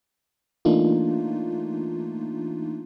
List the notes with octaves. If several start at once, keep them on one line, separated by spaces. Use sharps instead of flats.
E3 A3 A#3 D4 D#4 F4